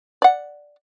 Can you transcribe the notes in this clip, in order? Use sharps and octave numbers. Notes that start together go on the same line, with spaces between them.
D5 F#5